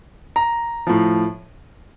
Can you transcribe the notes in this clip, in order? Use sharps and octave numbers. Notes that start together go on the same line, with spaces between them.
A#5
A2 F3